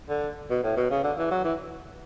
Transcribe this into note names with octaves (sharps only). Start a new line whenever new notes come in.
D3
B2
A2
B2
C#3
D3
E3
F#3
E3